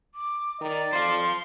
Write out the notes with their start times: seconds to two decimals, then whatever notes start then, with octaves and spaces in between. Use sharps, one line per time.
0.15 D6
0.61 D#3 D5 A#5
0.93 F2 C5 F5 C6